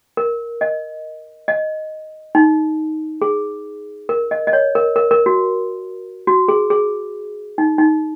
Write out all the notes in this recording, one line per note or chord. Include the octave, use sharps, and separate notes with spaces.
A#4
D#5
D#5
D#4
G#4
A#4
D#5
D#5
C#5
A#4
A#4
A#4
F#4
F#4
G#4
G#4
D#4
D#4